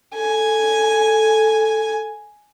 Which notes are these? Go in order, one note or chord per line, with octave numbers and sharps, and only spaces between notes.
A4 G#5